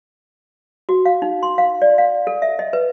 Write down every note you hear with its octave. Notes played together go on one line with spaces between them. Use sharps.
F#4
F5
D#4
C6
F5
D5
F5
A4
E5
D#5
B4